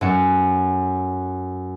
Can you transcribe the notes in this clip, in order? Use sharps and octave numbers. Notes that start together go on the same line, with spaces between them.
F#2 C#4 A4 F#5